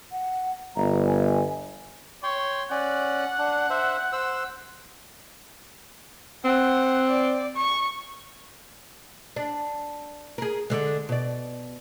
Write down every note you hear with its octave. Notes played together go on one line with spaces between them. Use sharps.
F#5
G1 A#5
G#5
C#5 G5 C6
C#4 D5 F#5
D4
C5 E5
C5 E6
C4 F#5
D5
C#6
D4
G#4 A#4
D3 G#3
B2 D5